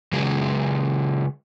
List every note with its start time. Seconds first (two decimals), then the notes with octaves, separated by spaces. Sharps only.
0.13 C#3 F#3 G#3 G#4